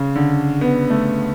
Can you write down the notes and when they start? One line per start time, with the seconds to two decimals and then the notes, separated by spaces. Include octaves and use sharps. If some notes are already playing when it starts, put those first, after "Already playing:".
Already playing: C#3
0.15 D3
0.61 B3
0.90 A3